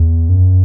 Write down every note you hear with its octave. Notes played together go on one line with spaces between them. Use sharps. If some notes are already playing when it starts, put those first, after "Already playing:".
Already playing: E2
F#2